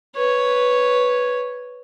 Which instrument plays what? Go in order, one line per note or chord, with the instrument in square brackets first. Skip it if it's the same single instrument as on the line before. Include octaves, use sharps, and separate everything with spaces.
[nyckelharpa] B4 C#5